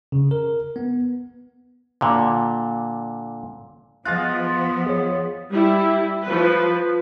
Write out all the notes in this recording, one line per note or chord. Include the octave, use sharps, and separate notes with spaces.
C#3
A#4
B3
A#2 D3
F3 B3 F4 G#4 D#5 F#6 A6
G#4 C#5
G3 E4
F3 B4